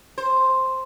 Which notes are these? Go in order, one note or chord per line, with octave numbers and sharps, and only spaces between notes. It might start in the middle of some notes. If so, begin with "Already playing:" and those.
C5